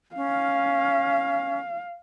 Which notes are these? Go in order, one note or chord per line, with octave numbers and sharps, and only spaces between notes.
C#4 F5